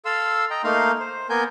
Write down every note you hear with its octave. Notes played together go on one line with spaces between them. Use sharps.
A4 F5 C6 E6
D#5 G5 A#5
A3 A#3 D#4 F5 C6
C5
A#3 B3 A#4 G#5 G6